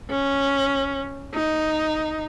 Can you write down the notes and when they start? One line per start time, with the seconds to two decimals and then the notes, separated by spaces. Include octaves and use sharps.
0.11 C#4
1.35 D#4